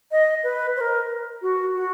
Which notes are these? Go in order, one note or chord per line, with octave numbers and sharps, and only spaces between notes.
D#5
B4
C5
A#4
F#4
F#4